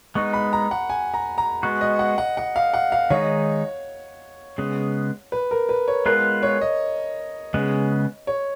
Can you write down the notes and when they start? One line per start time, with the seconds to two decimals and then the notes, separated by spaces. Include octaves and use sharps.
0.15 G#3 B3 D#4 C#6
0.34 B5
0.53 A#5
0.71 F#5
0.90 G#5
1.14 A#5
1.38 A#5
1.63 G#3 B3 F#4
1.81 D#5
1.99 F#5
2.18 F#5
2.37 F#5
2.56 F5
2.74 F#5
2.92 F5
3.10 D#3 G#3 D#4 C#5
4.58 C#3 G#3 B3
5.32 B4
5.51 A#4
5.69 B4
5.88 C#5
6.06 G#3 B3 F4 A#4 B4
6.43 C#5
6.61 D#5
7.54 C#3 G#3 B3
8.27 C#5